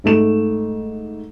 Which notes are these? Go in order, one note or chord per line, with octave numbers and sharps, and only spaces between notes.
G#2 A3 E7